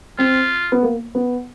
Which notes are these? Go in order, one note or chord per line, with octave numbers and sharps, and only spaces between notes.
C4 F4
B3
A#3
B3